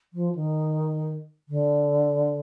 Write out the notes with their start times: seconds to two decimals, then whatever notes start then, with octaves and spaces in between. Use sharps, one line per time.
0.13 F3
0.35 D#3
1.49 D3